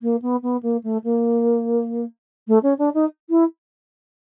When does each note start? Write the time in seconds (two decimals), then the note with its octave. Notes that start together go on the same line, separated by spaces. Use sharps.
0.02 A#3
0.22 B3
0.43 B3
0.63 A#3
0.84 A3
1.04 A#3
2.48 A3
2.63 C#4
2.79 D4
2.94 D#4
3.30 E4